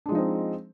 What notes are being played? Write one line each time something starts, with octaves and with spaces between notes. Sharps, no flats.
F3 G#3 C4 D4 D#4